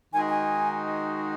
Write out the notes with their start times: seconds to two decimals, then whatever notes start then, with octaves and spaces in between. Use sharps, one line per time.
0.13 D#3 G#3 D#4 F#4 G#5
0.29 G#5